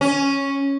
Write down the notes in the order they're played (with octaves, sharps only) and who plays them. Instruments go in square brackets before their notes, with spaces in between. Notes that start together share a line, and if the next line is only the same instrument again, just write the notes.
[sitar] C#4